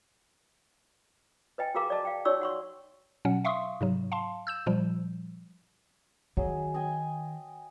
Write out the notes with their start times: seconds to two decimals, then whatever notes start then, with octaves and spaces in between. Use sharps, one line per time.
1.58 B4 D#5 G5 G#5
1.75 F#4 G#4 A#4 F5 A#5 D6
1.90 D5 D#5 A5
2.05 F5 G5
2.25 D#4 F#4 C#5 D5 C#6 E6
2.41 F#5 C6 C#6
3.25 B2 F#3 C#4 F#5
3.45 E5 F5 C6 C#6 D#6
3.81 G#2 C3 F#3
4.12 F5 A5 C6
4.47 E6 G6 E7
4.66 A#2 F3 G3
6.37 D#3 F#3 G#4 D#5
6.74 D#5 G5 G#5